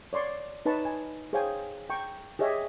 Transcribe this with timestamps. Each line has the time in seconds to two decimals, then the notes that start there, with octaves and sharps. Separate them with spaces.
0.13 C#5 D5 C6 C#6
0.66 D#4 B4 C#5 A5 C#6
0.85 G#5
1.33 G#4 C5 C#5 F5 G5 G#5
1.90 G5 A#5 C#6
2.39 G4 G#4 C#5 D#5 E5